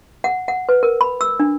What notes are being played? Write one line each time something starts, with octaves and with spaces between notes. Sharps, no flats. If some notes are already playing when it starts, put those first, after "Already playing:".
F#5
F#5
B4
A#4
B5
E6
D4